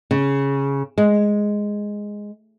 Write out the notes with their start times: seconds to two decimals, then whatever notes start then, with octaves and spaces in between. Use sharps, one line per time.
0.11 C#3
0.98 G#3